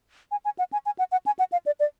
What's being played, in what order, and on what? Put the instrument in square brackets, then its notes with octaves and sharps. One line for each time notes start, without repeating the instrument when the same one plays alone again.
[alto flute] G#5
G#5
F#5
G#5
G#5
F#5
F#5
G#5
F#5
F5
D5
D5